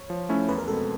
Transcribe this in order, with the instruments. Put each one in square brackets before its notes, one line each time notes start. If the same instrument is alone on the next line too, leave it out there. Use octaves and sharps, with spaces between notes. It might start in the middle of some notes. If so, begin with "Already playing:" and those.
Already playing: [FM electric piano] C#5
[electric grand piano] F3
A3 C#4 E4
[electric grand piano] E2 [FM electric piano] B4
[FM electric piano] A#4
[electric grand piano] B2 G#3 C4 [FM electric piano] A4